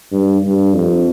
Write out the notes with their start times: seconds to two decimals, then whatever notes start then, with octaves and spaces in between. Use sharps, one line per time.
0.12 G2
0.42 G2
0.74 F2